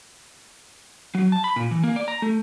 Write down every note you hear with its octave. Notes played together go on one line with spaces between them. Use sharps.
F#3
A5
B5
A#2
E3
A#3
D5
A#5
A3